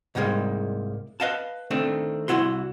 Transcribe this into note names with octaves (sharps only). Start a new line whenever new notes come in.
C2 G#2 G3 G#3 A#3
B4 D#5 F5 A5
D#3 A3 C4 D4
C2 F2 E4 F#4 C6